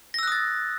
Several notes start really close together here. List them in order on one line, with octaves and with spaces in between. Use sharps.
A#6 E6 F#6 D#6 A6